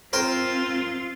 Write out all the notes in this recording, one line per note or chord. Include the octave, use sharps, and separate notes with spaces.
C4 F4 A#4 C5 G5